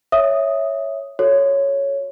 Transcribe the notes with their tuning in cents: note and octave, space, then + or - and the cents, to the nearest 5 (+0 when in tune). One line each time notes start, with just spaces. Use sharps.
C#5 +0 E5 +0 D#6 +0
F#4 +0 A4 +0 C#5 +0